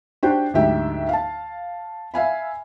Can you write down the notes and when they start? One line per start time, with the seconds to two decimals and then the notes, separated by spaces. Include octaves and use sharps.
0.23 D4 F#4 G4 C5 G5
0.54 D2 G#2 F#3 G4 E5 G5
1.09 F5 A5
2.14 E5 F5 G#5 B5